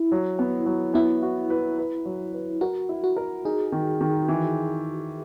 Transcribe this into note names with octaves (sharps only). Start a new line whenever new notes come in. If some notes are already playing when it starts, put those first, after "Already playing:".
Already playing: E4
F#3
B3
F#3
B3 E4
F#4
B4
B4
F#3
B4
F#4 A#4
E4
F#4
A#4
D#4 G#4
D#3
D#3
E3